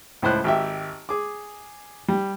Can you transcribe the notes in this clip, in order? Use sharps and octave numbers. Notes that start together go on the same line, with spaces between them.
C#2 A2 C5 F#6
G#1 G4 E5
G#4 D6
G3